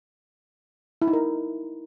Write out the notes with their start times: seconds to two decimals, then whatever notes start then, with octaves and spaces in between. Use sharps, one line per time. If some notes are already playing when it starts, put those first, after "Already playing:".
1.02 E4
1.07 D#4
1.13 A#4